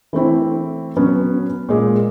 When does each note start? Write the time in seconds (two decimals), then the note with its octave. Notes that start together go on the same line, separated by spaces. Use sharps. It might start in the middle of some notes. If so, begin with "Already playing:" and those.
0.13 E3 A3 C4 E4
0.97 F#3 B3 C#4
1.69 A#2 G#3